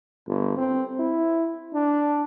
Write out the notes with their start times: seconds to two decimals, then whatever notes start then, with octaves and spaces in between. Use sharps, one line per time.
0.27 G1
0.57 C4
1.00 E4
1.74 D4